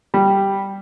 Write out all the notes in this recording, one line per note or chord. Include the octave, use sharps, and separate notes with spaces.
G3